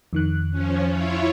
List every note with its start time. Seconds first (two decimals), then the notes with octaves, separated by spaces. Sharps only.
0.13 F2 D#3 F#6
0.51 F3 C#4
0.90 E4 F4 C#5